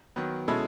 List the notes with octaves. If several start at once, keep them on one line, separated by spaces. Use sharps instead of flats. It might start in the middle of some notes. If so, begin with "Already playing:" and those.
D#3 F#3 B3
B2 G#3 C#4 E4 A4